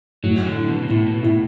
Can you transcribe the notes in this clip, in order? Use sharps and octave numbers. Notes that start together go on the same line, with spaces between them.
A2 F#3
D3
E4
B2
B2
A2 E4
B2
A2 E4